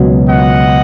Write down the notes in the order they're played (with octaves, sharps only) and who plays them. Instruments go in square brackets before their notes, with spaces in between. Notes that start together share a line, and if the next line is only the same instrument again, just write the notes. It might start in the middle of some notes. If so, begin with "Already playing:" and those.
Already playing: [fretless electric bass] C#2 B2 F#3
[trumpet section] D#5 F#5